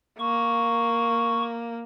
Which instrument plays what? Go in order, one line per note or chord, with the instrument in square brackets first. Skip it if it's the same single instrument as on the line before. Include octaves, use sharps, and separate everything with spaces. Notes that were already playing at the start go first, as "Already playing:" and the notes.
[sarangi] A#3 [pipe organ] C#6